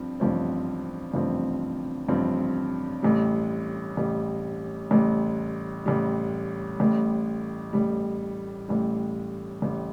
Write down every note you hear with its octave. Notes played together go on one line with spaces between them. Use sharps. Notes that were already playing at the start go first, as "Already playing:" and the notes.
Already playing: G2 F3 C4
A1 G2 F3 C4
A1 G2 F3 C4
A1 G2 F3 C4
A1 A2 G3
A1 A2 G3
A1 A2 G3
A1 A2 G3
A1 A2 G3
A1 A2 G3
A1 A2 G3
A1 A2 G3